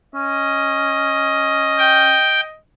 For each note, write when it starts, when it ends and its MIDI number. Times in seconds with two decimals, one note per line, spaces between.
0.15 2.17 61
0.15 2.60 75
1.78 2.40 79